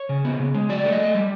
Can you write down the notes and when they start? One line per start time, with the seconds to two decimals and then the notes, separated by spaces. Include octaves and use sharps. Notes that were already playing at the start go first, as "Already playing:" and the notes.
Already playing: C#5
0.09 C#3
0.25 B3
0.39 C#3
0.54 G#3
0.69 F#3 D5
0.85 A3
0.92 D#5
1.00 A3
1.15 G3